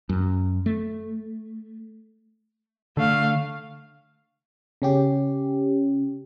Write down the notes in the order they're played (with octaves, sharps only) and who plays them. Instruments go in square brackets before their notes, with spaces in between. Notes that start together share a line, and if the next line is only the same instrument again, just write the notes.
[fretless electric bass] F#2
A3
[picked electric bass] D3 [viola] A3 F5
[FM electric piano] C#3 C#4 G4